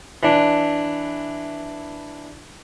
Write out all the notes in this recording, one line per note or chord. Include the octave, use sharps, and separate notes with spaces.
E3 D4